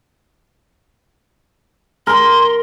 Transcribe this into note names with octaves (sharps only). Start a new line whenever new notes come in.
A#4 C6